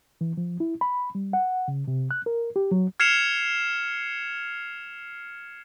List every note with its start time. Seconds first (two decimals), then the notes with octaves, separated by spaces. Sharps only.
0.21 E3
0.37 F3
0.60 E4
0.81 B5
1.15 G3
1.33 F#5
1.68 C#3
1.88 C3
2.11 F#6
2.26 A#4
2.56 G4
2.71 F#3
3.00 F6 G#6 C7 C#7 E7 F7